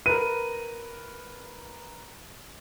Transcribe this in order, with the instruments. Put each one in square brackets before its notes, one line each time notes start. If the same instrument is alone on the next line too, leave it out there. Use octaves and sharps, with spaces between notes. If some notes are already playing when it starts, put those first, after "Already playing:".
[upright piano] A#4 B4 [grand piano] D#7